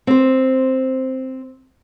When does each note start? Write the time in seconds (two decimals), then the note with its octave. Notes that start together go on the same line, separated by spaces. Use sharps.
0.07 C4 C5